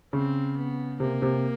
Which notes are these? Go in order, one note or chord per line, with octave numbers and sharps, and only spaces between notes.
C#3 C4
B3
C3 A#3
C3